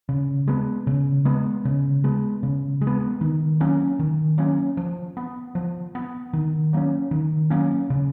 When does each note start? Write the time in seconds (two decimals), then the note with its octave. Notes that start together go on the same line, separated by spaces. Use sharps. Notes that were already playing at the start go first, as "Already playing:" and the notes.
0.09 C#3
0.48 G#3 B3
0.87 C#3
1.25 G#3 B3
1.65 C#3
2.04 G#3 B3
2.43 C#3
2.81 G#3
2.87 B3
3.21 D#3
3.60 F#3 A#3 C#4
3.99 D#3
4.38 F#3 A#3 C#4
4.77 F3
5.17 B3
5.55 F3
5.95 B3
6.33 D#3
6.73 F#3 A#3 C#4
7.11 D#3
7.50 F#3 A#3 C#4
7.90 C#3